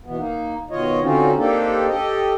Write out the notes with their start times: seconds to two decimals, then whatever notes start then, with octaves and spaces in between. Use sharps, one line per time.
0.04 B2 E3 B3
0.17 A#3 D#4
0.71 B2 D#3 F4 C#5 D#5
1.01 D3 C4 C#4 D#4 F4 F#4
1.37 A#3 C4 D4 D#4 G4 A4
1.88 G4 A4 D#5